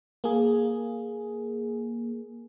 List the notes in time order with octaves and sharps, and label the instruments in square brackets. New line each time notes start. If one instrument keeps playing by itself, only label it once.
[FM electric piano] A#3 G#4